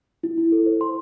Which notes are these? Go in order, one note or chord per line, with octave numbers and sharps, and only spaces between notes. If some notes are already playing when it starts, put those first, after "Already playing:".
E4
E4
A4
C5
C6